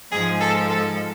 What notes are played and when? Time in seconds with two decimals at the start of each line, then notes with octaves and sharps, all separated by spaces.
0.11 G#2 F3 G#3 G#4
0.40 A4
0.69 A4